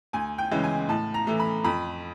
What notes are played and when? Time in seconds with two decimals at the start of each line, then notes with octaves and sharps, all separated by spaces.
0.13 D2 G#5
0.38 G5
0.51 C#3 E3 G#3
0.64 G#5
0.89 A2 A5
1.14 A#5
1.27 E3 A3
1.40 B5
1.64 F2 B5